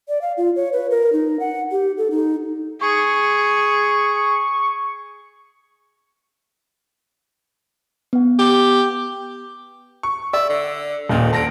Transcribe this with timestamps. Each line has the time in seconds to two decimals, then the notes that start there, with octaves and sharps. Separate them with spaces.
0.09 D5
0.22 F5
0.37 F4
0.56 C#5
0.73 B4
0.90 A#4
1.13 D#4
1.40 F#5
1.71 G4
1.97 A4
2.11 D#4
2.81 G#4 C#6
8.13 B3 F#5
8.39 G4
10.03 C#6
10.33 D5 E5
10.49 D3
11.09 D#1 A#2 D#3
11.33 D3 A5 A#6 D7